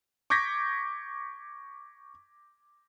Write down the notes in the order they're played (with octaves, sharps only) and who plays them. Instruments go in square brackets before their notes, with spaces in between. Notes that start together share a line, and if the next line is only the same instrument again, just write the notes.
[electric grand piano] C#6 D6 G6 G#6 A#6 B6